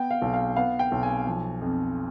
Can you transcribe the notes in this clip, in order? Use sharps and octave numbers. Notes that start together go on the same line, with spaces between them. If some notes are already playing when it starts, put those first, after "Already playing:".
Already playing: B3 G5
F5
B1
F5
B3 F5
G5
B1
G#5
F3
F2